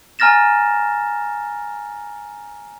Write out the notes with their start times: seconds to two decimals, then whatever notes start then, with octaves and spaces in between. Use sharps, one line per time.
0.19 G#5 A#5 F6 A6 A#6 E7